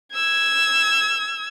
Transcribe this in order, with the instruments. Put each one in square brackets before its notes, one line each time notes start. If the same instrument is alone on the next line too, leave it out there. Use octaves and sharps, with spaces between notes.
[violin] E6 G#6